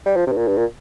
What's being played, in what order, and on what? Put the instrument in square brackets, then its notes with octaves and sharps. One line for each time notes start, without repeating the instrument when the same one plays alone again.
[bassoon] G3
F3
C3
G2
A#2
G2
A#2